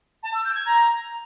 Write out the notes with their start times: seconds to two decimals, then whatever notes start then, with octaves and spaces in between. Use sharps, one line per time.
0.23 A5
0.34 E6
0.44 G6
0.55 G#6
0.66 A#5